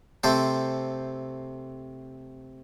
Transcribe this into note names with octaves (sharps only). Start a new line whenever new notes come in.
C3 A3 C4 A4 C5